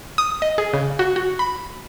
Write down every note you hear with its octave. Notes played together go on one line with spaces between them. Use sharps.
D#6
D#5
G#4
C#3
F#4
F#4
B5